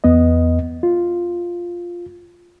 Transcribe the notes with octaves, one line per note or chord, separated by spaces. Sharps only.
E2 B3 D#5
F4